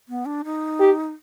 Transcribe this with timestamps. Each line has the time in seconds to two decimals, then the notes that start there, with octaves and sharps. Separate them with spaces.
0.09 B3
0.26 D4
0.45 D#4
0.80 G4